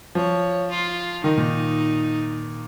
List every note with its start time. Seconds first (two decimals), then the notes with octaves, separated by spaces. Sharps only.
0.15 F3 C#5
0.70 F4
1.23 D#3 D#4
1.38 A#2